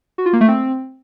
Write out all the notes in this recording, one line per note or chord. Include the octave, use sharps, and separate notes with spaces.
F#4
F4
A#3
A3
C4